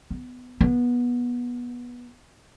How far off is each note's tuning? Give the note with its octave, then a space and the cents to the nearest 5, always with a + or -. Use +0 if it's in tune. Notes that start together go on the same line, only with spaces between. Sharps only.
B3 +15
B3 -20